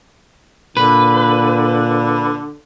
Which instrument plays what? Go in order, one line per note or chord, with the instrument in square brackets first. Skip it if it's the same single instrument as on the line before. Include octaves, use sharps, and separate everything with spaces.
[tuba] A#2 [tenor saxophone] D3 [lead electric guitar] B4